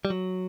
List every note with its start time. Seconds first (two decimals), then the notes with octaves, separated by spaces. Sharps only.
0.05 G3
0.10 F#3